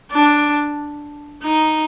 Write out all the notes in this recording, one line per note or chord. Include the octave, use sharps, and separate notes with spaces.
D4
D#4